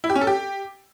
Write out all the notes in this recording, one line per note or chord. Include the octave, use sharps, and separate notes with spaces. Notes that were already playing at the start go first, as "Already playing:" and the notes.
E4
G4
C#4
A4
G4